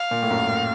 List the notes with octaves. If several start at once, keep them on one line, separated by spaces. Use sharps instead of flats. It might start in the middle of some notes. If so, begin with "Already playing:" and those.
Already playing: F5
A#2
A2
F#2
A2